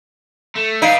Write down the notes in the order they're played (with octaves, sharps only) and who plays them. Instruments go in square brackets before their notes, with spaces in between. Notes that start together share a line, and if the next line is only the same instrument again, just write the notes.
[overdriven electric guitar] A3
[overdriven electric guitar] D4 B4 [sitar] D#4 [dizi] F5 [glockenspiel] B6 D7 D#7